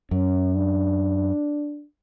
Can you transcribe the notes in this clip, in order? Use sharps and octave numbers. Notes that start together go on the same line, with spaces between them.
F#2 C#4
D4